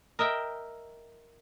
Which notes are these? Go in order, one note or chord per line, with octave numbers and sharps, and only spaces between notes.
A#4 D#5 E5 G5